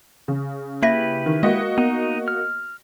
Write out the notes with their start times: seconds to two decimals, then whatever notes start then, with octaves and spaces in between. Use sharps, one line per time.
0.28 C#3
0.83 A#3 E4 G4 B4 E5 A#6
1.26 D#3
1.43 G#3 A#3 F#4 D#5
1.78 B3 D#4
2.28 F6